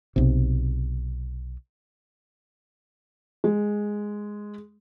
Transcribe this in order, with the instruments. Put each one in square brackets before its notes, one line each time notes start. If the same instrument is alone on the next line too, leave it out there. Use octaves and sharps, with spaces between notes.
[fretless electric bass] B1 C3
[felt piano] G#3